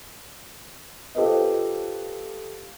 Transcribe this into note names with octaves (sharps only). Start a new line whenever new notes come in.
F4 G4 A4 B4 C5 D#5